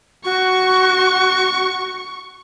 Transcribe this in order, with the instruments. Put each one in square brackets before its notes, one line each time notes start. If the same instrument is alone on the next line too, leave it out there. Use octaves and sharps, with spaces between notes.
[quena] F#4 [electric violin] C#6